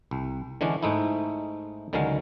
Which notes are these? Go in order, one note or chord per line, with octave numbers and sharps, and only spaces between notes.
C2
D3 E3 G#3 C#4 D4
G#2 G#3 A3 D#4 E4
C#2 D3 D#3 F#3 G#3 F5